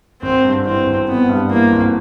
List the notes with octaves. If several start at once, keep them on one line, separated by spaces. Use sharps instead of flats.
G#1 C4
G2
E3 C4
G#1
G#1 B3
G2
E3 A#3
G#1